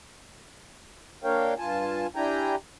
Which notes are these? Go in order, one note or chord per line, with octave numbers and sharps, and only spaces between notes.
A#3 D4 A#4 C#5 F5 G5
G2 F4 G#5 A5
D4 E4 G4 G5 G#5 A#5